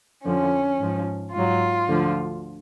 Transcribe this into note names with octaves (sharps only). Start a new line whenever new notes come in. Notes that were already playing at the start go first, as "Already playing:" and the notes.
F2 D3 F3 C#4
G#2 F3
G#2 F#3 F4
D2 D3 F3